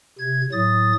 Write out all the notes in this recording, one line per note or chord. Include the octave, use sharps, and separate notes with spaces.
C3 G#6
A2 F#3 D#6 A6